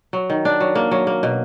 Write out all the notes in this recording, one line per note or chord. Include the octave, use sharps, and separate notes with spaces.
F#3
D#3
D4
F#3
A#3
F#3
A#3
B2